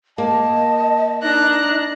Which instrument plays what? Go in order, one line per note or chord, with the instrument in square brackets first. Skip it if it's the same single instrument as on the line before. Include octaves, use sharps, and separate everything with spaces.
[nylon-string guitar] A#3 [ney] D#5 [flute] A5
[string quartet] D4 A#5 F#6 [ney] D#4